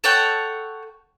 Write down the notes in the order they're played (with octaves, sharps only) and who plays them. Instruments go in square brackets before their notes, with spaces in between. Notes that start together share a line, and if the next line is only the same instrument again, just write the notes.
[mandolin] A4 C#5 F#5 G5